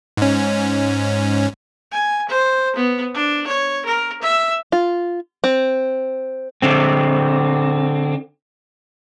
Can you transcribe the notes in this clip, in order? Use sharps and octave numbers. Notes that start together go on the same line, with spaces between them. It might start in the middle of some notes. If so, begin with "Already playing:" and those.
G#2 C#4
G#5
C5
B3
D4
C#5
A#4
E5
F4
C4
D3 C4